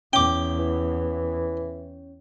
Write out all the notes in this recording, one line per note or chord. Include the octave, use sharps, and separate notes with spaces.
E2 C#4 C#5 G5 D6
E3